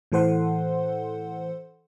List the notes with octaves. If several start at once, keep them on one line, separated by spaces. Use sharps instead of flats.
A2 E3 A4 C5 F#5 C6